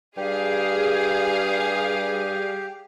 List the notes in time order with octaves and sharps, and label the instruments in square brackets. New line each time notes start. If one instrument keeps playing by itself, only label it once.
[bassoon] G2 [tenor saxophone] G3 [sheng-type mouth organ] G4 [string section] G#4 F5